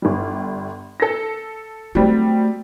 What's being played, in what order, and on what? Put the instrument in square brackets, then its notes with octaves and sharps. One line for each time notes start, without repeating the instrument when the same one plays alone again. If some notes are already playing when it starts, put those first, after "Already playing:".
[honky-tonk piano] G1 G3
A4 A#6
[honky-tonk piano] F#3 G3 C4 [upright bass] A3